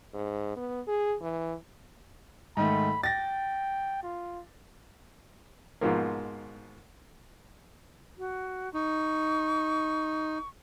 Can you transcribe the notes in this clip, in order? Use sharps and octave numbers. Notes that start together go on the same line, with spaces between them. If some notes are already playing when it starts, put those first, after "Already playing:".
G#2
B3
G#4
E3
G#2 D#3 A3 B5
G5 A6 A#6
F4
G#2 B2 F3 A#3
F#4
D#4 C#6